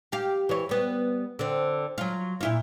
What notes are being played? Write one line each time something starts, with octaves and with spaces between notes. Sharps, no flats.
G4 F5
E3 C#5
G3 B3
D3 C4
F#3 F4
A#2 E4 F4